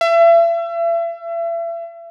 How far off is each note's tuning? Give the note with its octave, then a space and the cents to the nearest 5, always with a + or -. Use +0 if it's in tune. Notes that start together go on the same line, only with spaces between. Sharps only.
E5 +35